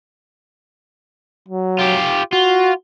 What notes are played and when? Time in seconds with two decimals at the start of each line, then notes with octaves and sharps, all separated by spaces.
1.49 F#3
1.79 F4 G4
2.33 F4 F#4